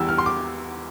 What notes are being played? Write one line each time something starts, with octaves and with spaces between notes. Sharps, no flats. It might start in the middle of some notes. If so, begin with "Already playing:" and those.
Already playing: E2 E3 G3 E6
F6
C6
D6